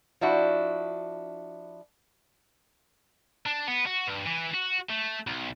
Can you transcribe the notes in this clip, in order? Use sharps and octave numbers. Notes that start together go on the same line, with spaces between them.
F3 D4 E4 F#4
D4
B3
F#4
G2
E3
F#4
A3
B1